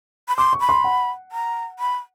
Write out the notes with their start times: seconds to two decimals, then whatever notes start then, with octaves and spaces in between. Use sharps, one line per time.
0.28 B5
0.37 C6 D6
0.53 C#6
0.61 B5
0.69 C6
0.84 F#5
1.32 A#5
1.79 B5